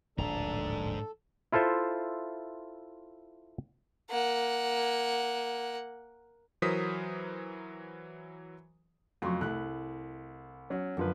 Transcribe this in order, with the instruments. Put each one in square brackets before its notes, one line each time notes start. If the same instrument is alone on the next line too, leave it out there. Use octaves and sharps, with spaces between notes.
[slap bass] D1 A#1 D#2 [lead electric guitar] G#2 A#5 [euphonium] D4 [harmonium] A4
[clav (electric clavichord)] E4 F4 A4 C5 E5
[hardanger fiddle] A#3 F#5
[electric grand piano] E3 F#3 A#4 C5 D#6 B6
[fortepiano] F2 C6 C#6 [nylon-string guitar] C#3 F#3 A3
[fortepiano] C2 F#6 [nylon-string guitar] A3 E4
[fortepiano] F#3 C#4
[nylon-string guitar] F#2 [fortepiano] D3 F3 B4